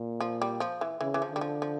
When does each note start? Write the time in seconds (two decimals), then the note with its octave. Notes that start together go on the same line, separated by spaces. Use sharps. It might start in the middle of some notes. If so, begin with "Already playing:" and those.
Already playing: A#2
0.20 F3
0.42 G3
0.60 F3
0.81 E3
1.01 C#3 E3
1.14 E3
1.22 F3
1.31 D3 G3
1.41 F3
1.62 F3